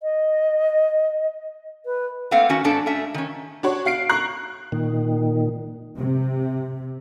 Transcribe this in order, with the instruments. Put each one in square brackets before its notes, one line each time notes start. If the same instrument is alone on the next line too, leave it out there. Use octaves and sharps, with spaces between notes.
[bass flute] D#5
B4
[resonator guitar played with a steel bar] A3 A#3 C4 F5 F#5
D#3 C#4 F#4
G#2 B3 D4 A4
A3 C#4 E5
D#3 C#4
[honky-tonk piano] D4 F#4 C#5
F#4 F5 C7 D7
A#5 C#6 F#6 C7
[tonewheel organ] A#2 D#3
[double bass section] C3